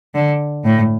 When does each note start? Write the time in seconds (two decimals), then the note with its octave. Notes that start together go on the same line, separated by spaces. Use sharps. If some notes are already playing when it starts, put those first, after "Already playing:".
0.15 D3
0.65 A2